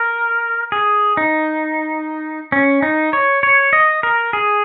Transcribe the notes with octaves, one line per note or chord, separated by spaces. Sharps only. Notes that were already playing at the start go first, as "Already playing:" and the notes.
Already playing: A#4
G#4
D#4
C#4
D#4
C#5
C#5
D#5
A#4
G#4